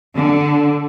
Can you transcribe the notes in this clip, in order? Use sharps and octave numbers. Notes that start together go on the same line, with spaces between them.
D3